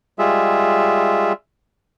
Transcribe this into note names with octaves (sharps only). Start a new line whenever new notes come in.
G3 G#3 F4 G#4 E5